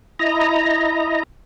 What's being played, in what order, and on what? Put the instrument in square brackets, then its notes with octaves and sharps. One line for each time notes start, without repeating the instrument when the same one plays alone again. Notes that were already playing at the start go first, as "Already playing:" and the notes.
[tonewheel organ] E4 D#5 A#5